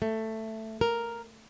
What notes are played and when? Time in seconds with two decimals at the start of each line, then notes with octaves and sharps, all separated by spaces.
0.02 A3
0.81 A#4